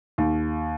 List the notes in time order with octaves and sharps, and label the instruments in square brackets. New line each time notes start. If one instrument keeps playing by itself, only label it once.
[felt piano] D#2